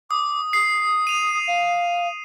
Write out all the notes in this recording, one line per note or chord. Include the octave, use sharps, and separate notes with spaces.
D6 D#6
D#6 C7
D#7 F7
F5